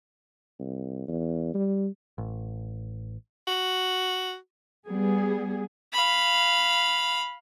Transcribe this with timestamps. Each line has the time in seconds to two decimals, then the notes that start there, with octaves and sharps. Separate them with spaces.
0.59 C2
1.08 E2
1.54 G3
2.18 A1
3.47 F#4
4.87 G3 B3 G#4
5.93 F5 B5